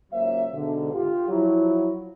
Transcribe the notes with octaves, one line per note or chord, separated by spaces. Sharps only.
C#2 G#2 F#3 A#3 C5 E5
G#2 B2 D3
F4 G4
F3 F#3 E4